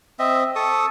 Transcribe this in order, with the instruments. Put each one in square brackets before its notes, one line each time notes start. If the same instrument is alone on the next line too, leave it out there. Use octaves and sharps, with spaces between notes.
[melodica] C4 D#5 E5
A4 C#6 D#6